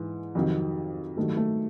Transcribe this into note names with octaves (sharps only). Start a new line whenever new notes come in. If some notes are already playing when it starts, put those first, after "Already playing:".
Already playing: G#2 E3
F2 C3 D#3 F#3
G2 D#3 F#3 A3
A3